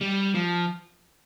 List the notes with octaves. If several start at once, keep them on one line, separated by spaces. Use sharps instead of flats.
G3
F3